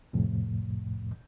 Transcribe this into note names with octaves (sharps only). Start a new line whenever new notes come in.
C2 F2 A2